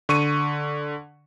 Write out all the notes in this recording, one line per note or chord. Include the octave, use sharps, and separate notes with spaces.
D3 C#6 C#7 D#7